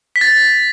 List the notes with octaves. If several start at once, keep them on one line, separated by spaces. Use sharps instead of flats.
B6
A6